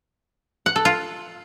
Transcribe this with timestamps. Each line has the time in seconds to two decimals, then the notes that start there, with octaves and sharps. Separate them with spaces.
0.66 F#5
0.76 A4
0.85 F4